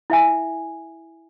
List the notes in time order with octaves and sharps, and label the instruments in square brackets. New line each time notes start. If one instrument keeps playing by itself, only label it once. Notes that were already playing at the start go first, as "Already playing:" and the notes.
[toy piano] E4 E5 G#5